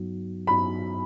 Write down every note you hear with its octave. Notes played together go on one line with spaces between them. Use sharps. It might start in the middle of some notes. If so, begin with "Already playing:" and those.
Already playing: G2 F#3 B3 D#4 F#4
G2 F#3 B3 D#4 F#4 B5